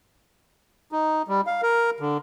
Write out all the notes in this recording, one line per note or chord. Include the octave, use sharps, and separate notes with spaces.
D#4
G3
F5
A#4
D3